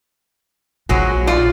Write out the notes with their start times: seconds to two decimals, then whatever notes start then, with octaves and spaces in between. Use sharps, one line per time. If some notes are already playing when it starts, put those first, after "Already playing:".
0.89 A#1 F#3 G#3 F#4
1.27 F4 D5